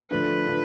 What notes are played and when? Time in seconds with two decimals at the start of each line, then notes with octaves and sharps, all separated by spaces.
0.11 D3 F3 A3 B4
0.47 D3 F3